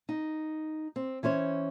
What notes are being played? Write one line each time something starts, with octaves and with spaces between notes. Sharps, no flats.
D#4
C4
E3 C#4 C5 C#5